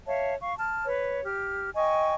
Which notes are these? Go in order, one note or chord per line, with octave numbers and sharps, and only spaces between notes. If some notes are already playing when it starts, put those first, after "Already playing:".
C#5 E5 F5 A5
F5 C#6
A5 F6
B4 C#5
G4 F6
D#5 G5 G#5 C#6